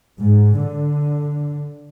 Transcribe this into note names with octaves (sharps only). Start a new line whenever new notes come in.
G#2
D3